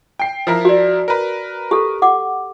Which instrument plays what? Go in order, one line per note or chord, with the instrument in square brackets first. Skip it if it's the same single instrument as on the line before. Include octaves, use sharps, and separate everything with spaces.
[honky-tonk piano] G5 C7
F3 E4 A#4
[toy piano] F#4 D5
[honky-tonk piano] A#4 B4
[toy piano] G4 A4
F#5 D6